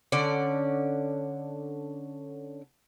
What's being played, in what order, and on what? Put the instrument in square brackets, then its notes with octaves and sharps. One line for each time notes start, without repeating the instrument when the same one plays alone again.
[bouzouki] D3 C#4 D5